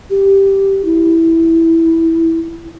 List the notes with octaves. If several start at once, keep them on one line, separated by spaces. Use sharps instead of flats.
G4
E4